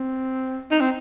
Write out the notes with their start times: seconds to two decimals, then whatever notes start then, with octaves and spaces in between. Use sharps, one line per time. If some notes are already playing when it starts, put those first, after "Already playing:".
Already playing: C4
0.71 D#4
0.80 C4